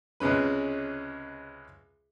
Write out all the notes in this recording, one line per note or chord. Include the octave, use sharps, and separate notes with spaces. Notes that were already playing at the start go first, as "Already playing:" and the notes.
C#2 C3 G#3 C#4 B4